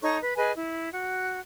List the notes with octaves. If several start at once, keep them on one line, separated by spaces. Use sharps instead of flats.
D#4 A4 C#5 C#6
B4
G#4 B4 D#5 G#5
E4
F#4